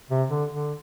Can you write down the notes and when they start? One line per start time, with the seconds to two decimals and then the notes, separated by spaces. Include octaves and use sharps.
0.10 C3
0.29 D3
0.52 D3